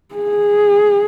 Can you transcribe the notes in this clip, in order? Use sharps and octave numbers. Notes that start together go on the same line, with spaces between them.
G#4